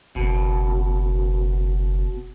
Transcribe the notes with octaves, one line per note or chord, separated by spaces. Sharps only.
F#1 B2